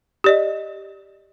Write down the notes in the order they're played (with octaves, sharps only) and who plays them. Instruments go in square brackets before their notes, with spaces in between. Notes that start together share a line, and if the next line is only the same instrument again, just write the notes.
[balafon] G4 D5 D#5